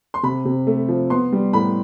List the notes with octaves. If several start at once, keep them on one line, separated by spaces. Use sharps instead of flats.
C6
C3 B5
C3
A3
F3
B3 C6
G3
A2 B5